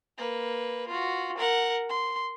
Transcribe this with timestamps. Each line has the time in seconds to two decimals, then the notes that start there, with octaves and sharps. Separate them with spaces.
0.18 A#3 B4
0.88 F4 F#4
1.38 A#4 F#5
1.89 C6